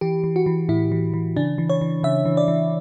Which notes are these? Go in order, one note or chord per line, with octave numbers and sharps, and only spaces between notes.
E3 G4
E3
F#4
E3
A2 E4
E3
E3
C#3 D4
E3
C#5
E3
C#3 E5
E3
D5
E3